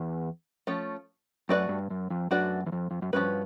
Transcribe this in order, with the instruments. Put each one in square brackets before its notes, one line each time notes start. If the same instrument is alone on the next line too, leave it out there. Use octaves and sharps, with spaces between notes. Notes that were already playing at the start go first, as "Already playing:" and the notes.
Already playing: [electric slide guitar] E2
[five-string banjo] F3 A3 C#4
[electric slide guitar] F#2 [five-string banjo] A3 D4 F#4 B4 D5
[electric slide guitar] G2
F#2
F2
[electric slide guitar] F#2 [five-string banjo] A3 D4 F#4 B4 D5
[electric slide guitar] E2
F2
F2
F#2
[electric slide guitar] G2 [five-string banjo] F3 A#3 C#4 F#4 B4